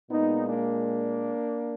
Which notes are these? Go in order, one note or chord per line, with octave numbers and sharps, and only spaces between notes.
A#2 G#3 B3 D#4
A#3 D4